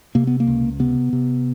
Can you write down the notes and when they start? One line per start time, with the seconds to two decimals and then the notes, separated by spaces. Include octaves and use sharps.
0.15 C3 A#3
0.27 B3
0.40 A#3
0.47 C#2
0.80 C3 B3
1.13 C3